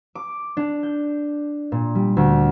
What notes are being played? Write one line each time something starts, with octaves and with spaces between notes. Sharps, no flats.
D6
D4
G6
A#2
G3
D2